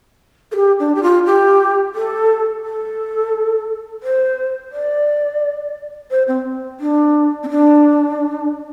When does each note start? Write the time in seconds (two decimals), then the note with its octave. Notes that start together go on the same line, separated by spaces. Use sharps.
0.52 A4
0.56 G4
0.79 D4
0.95 G4
1.03 F4
1.26 G4
1.95 A4
2.64 A4
4.03 C5
4.72 D5
6.11 C5
6.28 C4
6.80 D4
7.43 C4
7.49 D4